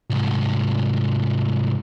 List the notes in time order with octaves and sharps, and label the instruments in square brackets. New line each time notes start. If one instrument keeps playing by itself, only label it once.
[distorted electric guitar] C2 G#2